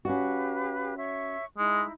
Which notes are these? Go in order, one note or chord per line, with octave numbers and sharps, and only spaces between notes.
C#4 F#4 G4 B4 F5
C#5 E5 C#6
G#3 D#4 E4